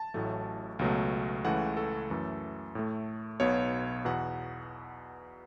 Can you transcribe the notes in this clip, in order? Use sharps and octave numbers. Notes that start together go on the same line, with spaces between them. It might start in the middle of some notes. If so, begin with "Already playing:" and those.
Already playing: A5
A1 A2 F#3 A3
C#2 B2 F#3 A3
C#2 C#3 E3 A3 F#5
A4
F#2 E3 A3
A2 A3
B1 B2 B3 C#5
E2 B2 B3 F#5